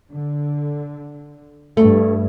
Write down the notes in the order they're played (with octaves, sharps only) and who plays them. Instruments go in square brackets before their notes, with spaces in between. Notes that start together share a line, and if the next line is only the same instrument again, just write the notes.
[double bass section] D3
[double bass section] G2 [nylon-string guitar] A3